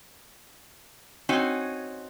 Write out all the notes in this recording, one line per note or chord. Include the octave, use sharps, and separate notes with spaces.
C4 C#4 D#4 F#4 C#5 G#5